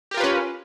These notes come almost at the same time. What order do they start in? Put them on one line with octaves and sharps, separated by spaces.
G4 A#4 F4 B4 C#4